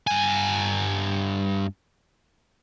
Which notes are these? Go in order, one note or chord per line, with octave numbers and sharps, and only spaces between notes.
G2 G#5